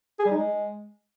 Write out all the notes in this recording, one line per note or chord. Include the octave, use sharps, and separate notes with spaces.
G#4
G3
D#4
G#3